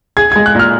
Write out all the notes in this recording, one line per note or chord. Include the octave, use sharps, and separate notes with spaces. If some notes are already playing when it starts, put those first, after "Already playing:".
G#4 G#6
G#3 G#6
F#6
A#2 F6